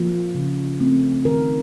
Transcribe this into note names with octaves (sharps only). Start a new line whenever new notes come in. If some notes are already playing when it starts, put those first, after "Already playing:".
Already playing: F3 A#3
C#3
A3 C4
D#3 A#4